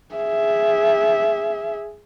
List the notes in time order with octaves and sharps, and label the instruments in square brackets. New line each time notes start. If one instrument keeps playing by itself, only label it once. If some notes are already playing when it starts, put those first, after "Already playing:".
[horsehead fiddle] G#4 E5